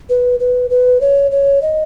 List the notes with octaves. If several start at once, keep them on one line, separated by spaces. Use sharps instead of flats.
B4
B4
B4
C#5
C#5
D#5